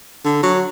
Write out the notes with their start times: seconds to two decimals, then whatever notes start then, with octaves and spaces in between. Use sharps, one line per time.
0.25 D3
0.43 F#3